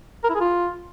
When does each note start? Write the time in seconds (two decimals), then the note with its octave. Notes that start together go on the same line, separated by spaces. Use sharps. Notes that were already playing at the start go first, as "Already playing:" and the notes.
0.24 A#4
0.30 E4
0.35 G#4
0.41 F4